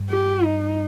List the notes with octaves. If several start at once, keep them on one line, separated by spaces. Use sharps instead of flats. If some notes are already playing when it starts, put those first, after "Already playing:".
Already playing: G2
G4
D#4